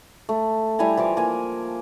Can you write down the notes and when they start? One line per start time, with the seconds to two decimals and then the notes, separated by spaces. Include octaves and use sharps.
0.29 A3
0.79 G3 E4 G#5 A#5
0.97 E3 F3 D6
1.17 A#3 G#5